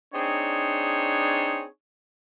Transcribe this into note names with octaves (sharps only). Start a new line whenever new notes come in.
C4 D4 D#4 G#4 C5 C#5